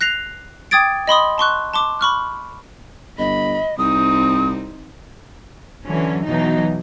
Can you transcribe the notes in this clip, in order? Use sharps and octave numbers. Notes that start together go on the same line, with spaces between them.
F#6 A#6 C7 F7
G5 D6 D#6 G#6 A6 D7
D#5 B5 C6 D#6
A5 C6 C#6 F#6
A5 C6 D6
B5 C#6 F6 F#6
G1 D#5 B5
C2 C4 D#4 D#6
D3 E3 F#3 C#4
B2 E3 F#3 D#4